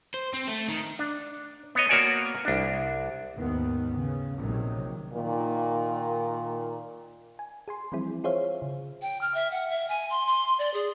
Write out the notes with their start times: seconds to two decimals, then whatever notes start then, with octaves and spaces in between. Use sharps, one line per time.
0.14 C5
0.34 C4
0.48 A3
0.69 D#3
0.99 D4
1.75 B3 C#5 D#5
1.89 A#3 B3 F#4 C#5 D5 G#5
2.45 C2 D4
3.36 D#2 G#2 D#3 B3
3.97 C#3
4.38 A#1 C3 D#3 F#3
5.13 A#2 D#3
7.39 G#5
7.68 G#4 G#5 C6
7.92 E3 F3 G3 C4 E4 G#4
8.24 F4 G#4 C5 C#5 E5 F5
8.62 C#3
9.02 G5
9.21 F6
9.34 E5
9.51 F#5
9.70 E5
9.89 G#5
10.10 C6
10.27 C6
10.59 D5
10.74 G#4